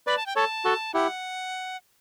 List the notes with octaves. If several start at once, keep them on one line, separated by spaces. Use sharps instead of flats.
B4 D5 B5
A5
G5
A4 C#5 A5
F#4 A4
E4 G4 F#5